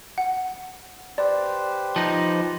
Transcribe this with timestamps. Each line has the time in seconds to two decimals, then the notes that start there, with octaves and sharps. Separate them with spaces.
0.18 F#5
1.18 G4 B4 C5 D5
1.96 F3 D#4